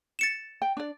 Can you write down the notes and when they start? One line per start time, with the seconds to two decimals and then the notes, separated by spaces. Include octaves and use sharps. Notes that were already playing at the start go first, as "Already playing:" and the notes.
0.19 A6 C#7 E7
0.62 G5
0.77 D4 D5